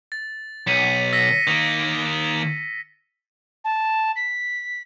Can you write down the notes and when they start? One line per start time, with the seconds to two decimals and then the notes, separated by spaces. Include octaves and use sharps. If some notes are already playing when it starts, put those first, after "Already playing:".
0.12 A6
0.67 B1 B6 C#7 D#7
1.13 E6 A#6 B6
1.47 D#3 A#3
3.64 A5
4.16 B6